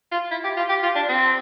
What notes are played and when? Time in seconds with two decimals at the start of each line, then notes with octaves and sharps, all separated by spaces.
0.12 F4
0.31 E4
0.44 G4
0.57 F4
0.69 G4
0.83 F4
0.95 D4
1.09 C4